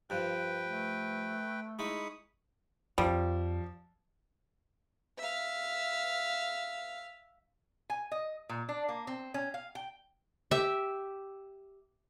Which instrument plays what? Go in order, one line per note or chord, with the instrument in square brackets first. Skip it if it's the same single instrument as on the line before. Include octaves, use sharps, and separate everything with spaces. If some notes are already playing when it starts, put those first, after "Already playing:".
[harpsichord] G2 F3 [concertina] B4 G5
[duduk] A3
[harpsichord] G#3 D#4 E4 [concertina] B5 C#6 D#6
[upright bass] F2 [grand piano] F3 [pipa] G3
[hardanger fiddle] E5 F5
[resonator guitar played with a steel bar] G#5
D#5
A#2
D4
A#3
C4
C#4
F5
G5
[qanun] G4 E5